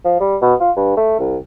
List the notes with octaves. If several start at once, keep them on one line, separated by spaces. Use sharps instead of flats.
F3
G3
B2
F4
G2
A3
C2